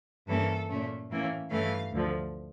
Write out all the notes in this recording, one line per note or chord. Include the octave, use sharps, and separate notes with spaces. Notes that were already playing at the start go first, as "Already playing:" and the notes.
G2 E3 A#3 C#4 A4
A#2 A3 C#4
A2 E3 A#3 C#4
G2 E3 A3 C#4 F5
D2 D3 F3